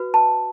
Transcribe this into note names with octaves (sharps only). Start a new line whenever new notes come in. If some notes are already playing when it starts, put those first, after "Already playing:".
Already playing: F#4 B4
A5